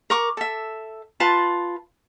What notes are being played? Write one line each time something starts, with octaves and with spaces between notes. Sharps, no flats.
A#4 C#6 D6
A4 E5
F4 B4 A5 C6